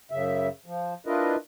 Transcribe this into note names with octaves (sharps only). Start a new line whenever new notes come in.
F#2 C#3 E5
F3
D4 E4 F4 A#4 B4 D#5